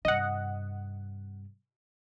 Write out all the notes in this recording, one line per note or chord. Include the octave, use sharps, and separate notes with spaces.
G2 C3 D#5 F#5